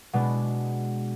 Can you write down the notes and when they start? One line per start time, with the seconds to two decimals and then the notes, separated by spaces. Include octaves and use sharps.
0.13 B2 G#3 D4